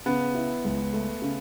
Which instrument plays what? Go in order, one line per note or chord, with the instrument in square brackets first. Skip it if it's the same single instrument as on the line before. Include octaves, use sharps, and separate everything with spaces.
[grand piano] C#3 [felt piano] B3
[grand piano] E4
C#2
A3
C#3